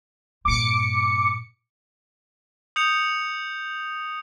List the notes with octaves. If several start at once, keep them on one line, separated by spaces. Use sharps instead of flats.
G2 A#2 D6 C#7
D#6 G6 C#7 F7